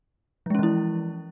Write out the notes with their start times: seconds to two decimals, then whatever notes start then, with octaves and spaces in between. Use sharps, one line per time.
0.46 F3
0.50 G#3
0.55 C#4
0.59 E3
0.63 E4